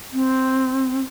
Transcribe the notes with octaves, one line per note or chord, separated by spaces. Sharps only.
C4